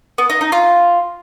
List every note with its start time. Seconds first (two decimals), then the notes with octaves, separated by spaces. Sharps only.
0.18 B3
0.30 D#4
0.41 D#4
0.52 F4